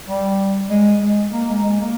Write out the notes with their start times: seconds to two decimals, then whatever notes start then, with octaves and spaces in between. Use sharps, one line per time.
0.08 G3
0.70 G#3
1.01 G#3
1.33 A#3
1.49 G#3
1.64 G#3
1.80 A#3